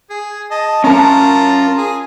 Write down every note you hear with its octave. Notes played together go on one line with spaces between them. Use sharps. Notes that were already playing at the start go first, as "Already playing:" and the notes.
G#4
D#5 A5
C#4 F4 A#4 A5 A#5
G#4